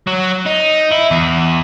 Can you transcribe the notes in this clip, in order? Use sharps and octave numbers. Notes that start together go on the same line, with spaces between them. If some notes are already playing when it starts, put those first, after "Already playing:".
F#3
D#4
E4
E2